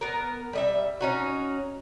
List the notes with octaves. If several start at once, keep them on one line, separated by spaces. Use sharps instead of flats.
B3 A#4
G3 D#5 E5
C#4 D#4 F#4